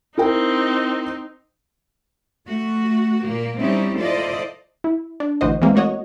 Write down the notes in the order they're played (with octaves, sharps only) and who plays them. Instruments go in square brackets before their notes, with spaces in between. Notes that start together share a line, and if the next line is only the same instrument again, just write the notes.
[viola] C4 D#4 [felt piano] E4 A#4 G5
[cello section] A3 F#4
A#2 A#3
G3 C4 C#4 D#4 E4
E4 F4 A4 C5 D5 D#5
[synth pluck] E4
D4
A1 D2 E3 F#4 C5 D#5
E3 G#3 A#3 C4
A3 A#3 F#4 C#5 D#5